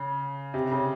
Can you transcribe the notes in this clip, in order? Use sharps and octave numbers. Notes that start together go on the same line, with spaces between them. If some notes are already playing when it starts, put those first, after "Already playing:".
Already playing: C#3
C3
C#3